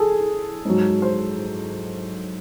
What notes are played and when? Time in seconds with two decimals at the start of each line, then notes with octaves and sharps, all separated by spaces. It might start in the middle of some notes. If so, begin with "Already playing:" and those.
Already playing: G#4 A4
0.65 G#2 F#3
1.02 C5